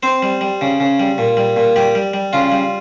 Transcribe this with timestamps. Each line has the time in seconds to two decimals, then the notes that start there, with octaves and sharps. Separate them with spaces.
0.03 C4 C5
0.23 G3
0.41 G3
0.61 C#3
0.80 C#3
1.00 G3
1.18 A#2
1.37 G3
1.56 A#2
1.76 G3 G4
1.95 G3
2.14 G3
2.33 C#3 F4
2.52 G3